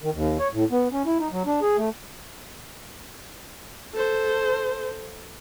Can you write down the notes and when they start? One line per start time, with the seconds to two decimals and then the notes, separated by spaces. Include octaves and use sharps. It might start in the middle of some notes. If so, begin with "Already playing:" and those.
0.02 D#3
0.14 D#2
0.39 C#5
0.53 A2
0.71 B3
0.92 C#4
1.06 E4
1.20 D#4
1.32 F#3
1.46 D4
1.61 G#4
1.77 A3
3.94 A4 C5